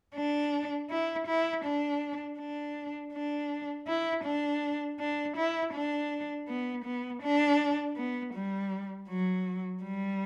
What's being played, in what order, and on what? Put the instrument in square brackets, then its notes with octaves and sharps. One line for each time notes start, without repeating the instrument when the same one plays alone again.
[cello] D4
E4
E4
D4
D4
D4
E4
D4
D4
E4
D4
B3
B3
D4
B3
G3
F#3
G3